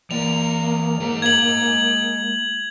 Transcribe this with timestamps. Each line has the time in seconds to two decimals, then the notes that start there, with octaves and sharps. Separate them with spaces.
0.11 E3 A#3 D5 F7
1.00 G#3 G#4 C5
1.22 G#6 F#7